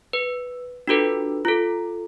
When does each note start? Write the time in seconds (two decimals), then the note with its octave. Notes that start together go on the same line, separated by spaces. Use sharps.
0.13 B4
0.87 D4 F4 F#4 A4 B4
1.45 F4 A4